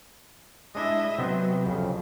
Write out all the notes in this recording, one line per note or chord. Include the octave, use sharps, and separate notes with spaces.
G#3 D4 E4 D#5 E5
C3 F#3 B3 C4
F2 C#3